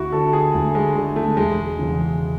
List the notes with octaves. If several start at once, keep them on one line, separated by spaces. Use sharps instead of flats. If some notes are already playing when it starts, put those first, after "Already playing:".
Already playing: D2 E4 F#4
D3 A4
G#4
D2 A3
G#3
D3 G#3
A3
E1 G#3
E2 C#3